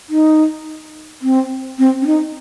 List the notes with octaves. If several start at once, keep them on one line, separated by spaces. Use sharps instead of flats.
D#4
C4
C4
C#4
D#4